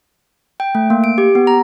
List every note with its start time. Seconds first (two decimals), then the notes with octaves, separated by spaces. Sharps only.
0.60 G5
0.75 A3
0.90 A#3
1.04 D7
1.18 G4
1.35 B3
1.47 A#5